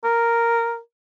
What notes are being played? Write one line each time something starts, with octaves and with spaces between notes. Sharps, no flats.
A#4